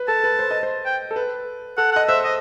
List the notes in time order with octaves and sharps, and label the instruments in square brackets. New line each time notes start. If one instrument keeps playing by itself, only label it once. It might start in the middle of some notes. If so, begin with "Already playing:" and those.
Already playing: [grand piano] B4
[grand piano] A4 [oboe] A5
[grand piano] B4
C5
D#5
C5
[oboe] G5
[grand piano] A4
B4
[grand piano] A4 [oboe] F#5
[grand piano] D#5 [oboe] F#5
[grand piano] C5 [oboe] E5
[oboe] D#5